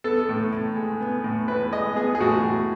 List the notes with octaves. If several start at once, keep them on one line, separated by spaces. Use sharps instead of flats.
B3 A4
A2
A2
G#3
B3
A2
A2 B4
G#3 D#5
B3 G#4
G#4
A2 F#4
A2